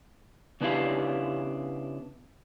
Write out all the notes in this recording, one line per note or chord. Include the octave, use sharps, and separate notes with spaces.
C#3 B3 D4 E4 G4 F5